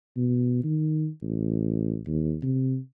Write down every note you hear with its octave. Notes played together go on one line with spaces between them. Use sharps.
B2
D#3
A1
D#2
C3